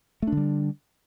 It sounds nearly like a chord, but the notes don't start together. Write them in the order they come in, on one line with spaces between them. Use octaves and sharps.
A3 D4 D3 G3